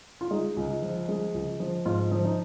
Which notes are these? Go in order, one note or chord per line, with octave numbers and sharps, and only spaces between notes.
F4
G#3 D#4
C#2
F3
G#3
C#2
F3
G#2 F4
F3
D#4